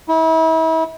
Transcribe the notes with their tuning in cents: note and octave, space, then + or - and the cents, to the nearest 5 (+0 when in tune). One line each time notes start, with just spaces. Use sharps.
E4 -40